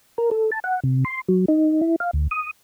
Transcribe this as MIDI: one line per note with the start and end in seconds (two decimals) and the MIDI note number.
0.18 0.30 70
0.31 0.50 69
0.52 0.60 81
0.64 0.80 78
0.84 1.04 48
1.05 1.21 84
1.29 1.45 54
1.48 1.81 63
1.81 1.96 64
2.00 2.11 77
2.13 2.27 38
2.31 2.51 87